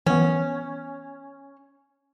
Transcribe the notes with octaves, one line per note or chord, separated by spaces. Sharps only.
E3 B3 C#4